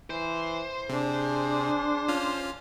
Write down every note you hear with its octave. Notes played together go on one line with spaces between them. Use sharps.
E3 C5
C3 D4 G#4
C#4 F4 F6